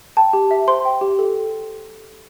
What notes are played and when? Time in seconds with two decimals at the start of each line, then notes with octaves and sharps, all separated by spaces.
0.17 G5 A5
0.33 G4
0.51 E5
0.68 C5 C6
0.85 G5
1.01 G4
1.19 A4